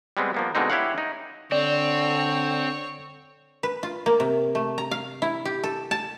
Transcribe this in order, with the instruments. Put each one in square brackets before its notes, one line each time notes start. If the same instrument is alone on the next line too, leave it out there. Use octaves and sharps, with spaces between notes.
[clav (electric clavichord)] G3 G#3 B3 C4
F3 A#3 B3
B2 D3 G#3 C4 D#4
E4 G4 C#5 F5 F#5
D#4
[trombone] D3 [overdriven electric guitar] C4 [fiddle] C#5 [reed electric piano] D5
[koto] B4
F4
A#3
C3
A3
A#5
F5
E4
G4
A4
A5